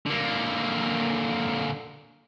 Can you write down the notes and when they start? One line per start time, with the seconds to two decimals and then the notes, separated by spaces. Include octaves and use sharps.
0.06 D3 A#3